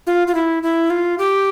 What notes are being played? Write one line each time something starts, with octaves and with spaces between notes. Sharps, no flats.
F4
F4
E4
E4
F4
G4